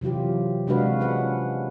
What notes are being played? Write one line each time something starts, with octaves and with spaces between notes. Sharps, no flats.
C3 E3 F#3 F4 G4
C3 G#3 D4 F#4 B4 F5
C#4 F4 B4 F#5